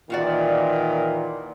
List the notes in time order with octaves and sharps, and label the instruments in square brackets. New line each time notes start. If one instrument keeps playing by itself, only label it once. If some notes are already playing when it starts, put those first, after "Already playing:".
[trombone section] A#2 D#3 E3 [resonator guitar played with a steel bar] F4 F#4 D5